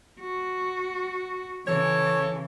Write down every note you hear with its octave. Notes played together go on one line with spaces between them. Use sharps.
F#4
C#3 E3 A4 C#5